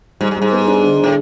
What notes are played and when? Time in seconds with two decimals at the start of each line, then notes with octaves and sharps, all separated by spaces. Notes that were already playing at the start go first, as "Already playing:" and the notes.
0.21 G#2 G3
0.31 G#2
0.36 G3
0.42 G#2
0.52 B3
0.68 D4
0.83 D3
0.99 A2 D3